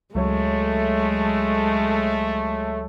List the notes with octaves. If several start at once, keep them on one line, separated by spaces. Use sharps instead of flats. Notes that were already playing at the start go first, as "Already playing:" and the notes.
C#2 F#3 G#3 A3 C#5